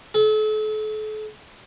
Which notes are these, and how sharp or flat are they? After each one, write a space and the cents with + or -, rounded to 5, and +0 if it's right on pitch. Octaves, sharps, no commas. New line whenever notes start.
A4 -40